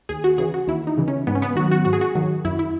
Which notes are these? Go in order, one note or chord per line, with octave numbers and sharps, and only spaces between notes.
D#2 G#4
F#4
C#3 E3 G#4
F#4
D#2 E4
D#4
C#3 E3
C#4
G#2 B3
C#4
B3
D#3 F#3 F#4
F#4
G#2 F#4
G#4
F#4
D#3 F#3
F#2 E4
E4